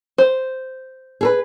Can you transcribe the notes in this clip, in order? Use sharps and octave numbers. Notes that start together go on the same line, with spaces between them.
C5
G#4 A4 B4